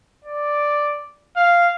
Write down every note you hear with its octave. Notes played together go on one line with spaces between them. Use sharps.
D5
F5